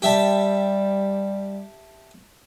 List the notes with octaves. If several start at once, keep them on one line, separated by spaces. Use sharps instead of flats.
G3 G4 E5 A5